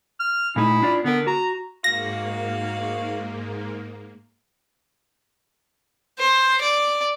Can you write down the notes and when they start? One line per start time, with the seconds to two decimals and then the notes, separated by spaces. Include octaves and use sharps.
0.20 F6
0.56 A#2 A3 D#4 E4
0.82 D4 F4 D5
1.04 D3 B3 A#4
1.27 F#4 A#5
1.84 G#2 A#3 F#4 F5 A#6
6.19 C5
6.62 D5